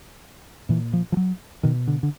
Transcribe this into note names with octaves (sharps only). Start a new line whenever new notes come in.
A#2 E3
F3
F3
F#3
B2 D#3
D3
D3